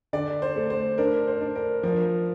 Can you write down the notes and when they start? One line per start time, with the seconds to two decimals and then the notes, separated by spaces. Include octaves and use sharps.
0.13 D3 D5
0.42 C5
0.56 A3
0.70 C5
0.98 D4 A#4
1.27 C5
1.41 D4
1.55 A#4
1.83 F3 A#4